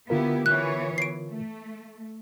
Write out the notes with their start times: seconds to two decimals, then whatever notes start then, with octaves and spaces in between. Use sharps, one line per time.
0.10 D3 B3 E4 F4 G4 A#4
0.46 E3 B3 C#5 F#6
0.98 C7 D7
1.30 A3